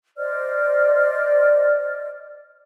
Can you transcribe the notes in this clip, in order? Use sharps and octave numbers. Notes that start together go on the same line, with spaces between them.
C5 D5 D#5 F6